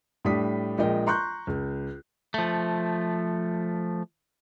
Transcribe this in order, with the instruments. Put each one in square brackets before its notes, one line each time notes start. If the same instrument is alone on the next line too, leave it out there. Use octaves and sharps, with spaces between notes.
[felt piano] A2 G3 A3 D4 D#6 B6
A#1 G#3 A#4 D#5 G5
A#5 C6 C#6 F#6 G6
C#2
[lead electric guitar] F3 A3